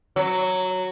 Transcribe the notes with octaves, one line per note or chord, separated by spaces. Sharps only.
F#3